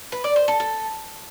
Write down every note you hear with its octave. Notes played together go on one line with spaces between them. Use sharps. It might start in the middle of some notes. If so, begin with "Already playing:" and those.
B4
D5
C5
A4
A4